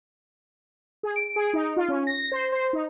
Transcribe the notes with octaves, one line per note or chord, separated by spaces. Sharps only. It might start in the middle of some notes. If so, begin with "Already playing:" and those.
G#4
D7
G#4
D#4
F4
C#4
A#6
C5
C5
D#4